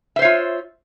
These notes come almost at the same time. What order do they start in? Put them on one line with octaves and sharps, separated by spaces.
E5 C5 C#5 F4